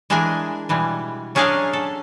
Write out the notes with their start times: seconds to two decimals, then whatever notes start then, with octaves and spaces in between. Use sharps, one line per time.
0.10 E3 G#3 D4 G#4 A#4 G#5
0.69 B2 E3 G3 G#3
1.35 F#3 C#4 D4 G#4 D#5 F5
1.73 A4